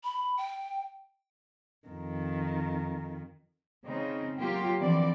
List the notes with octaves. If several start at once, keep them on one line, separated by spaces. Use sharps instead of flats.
B5
G5
F2 D#3
C#3 C4 D#4
F#3 A#3 F4 G4
D3 E3 F3 C4 D5